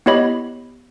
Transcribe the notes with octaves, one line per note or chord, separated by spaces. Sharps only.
B3 E4 G4 C#5 D#5 B5